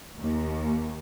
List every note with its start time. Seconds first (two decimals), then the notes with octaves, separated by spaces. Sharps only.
0.19 D#2